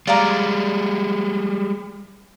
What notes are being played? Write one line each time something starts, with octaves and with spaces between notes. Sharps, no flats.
G3 G#3 D5 F5 A#5